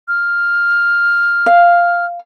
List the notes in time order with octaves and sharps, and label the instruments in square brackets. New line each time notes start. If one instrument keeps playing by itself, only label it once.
[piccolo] F6
[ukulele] F5